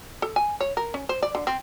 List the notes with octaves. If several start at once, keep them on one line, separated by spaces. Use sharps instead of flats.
A4
G#5
C#5
A#4
C#4
C5
D5
D3
C4